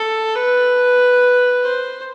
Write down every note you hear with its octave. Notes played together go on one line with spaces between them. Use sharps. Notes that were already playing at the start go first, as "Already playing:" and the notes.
Already playing: A4
B4
C5